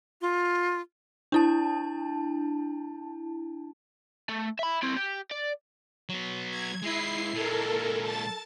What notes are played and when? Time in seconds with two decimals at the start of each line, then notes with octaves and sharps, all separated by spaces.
0.21 F4
1.32 D4 E4 A5
4.29 A3
4.59 E5 B5
4.83 C4 E4
4.97 G4
5.31 D5
6.09 F#3 B3
6.50 G#6
6.82 G#3 E4 B4 C7
7.34 A#2 G#3 A4 A#4
8.02 A5 A6